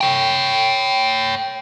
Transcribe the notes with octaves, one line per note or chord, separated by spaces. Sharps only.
C#5 G5